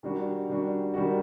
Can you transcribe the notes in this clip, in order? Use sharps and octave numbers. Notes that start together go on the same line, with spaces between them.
D#3 G3 D4 F#4
D#3 G3 D4 F#4
D#3 G3 D4 F#4